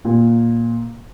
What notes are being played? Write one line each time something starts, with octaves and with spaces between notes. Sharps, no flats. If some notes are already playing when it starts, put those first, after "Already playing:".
A#2